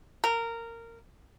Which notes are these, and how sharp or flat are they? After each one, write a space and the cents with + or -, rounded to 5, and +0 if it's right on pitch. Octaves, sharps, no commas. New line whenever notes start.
A#4 -15